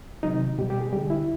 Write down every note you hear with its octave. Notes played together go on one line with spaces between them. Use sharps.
C3 D#3 F#3 D#4
B2 G3 G4
G4
G#4
D3 G3 G4
E4